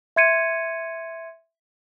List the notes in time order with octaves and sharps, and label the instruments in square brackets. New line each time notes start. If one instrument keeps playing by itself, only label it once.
[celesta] E5 C6 G#6 C#7 D#7